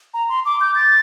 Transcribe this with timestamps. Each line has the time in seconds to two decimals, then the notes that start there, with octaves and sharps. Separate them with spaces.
0.14 A#5
0.29 C6
0.45 D6
0.61 G6
0.75 A6